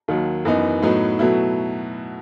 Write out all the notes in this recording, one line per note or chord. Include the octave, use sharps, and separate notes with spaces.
D#2 D#3 F#3
F#2 E3 B3 D#4
A2 F#3 B3 D#4
B2 F#3 A3 E4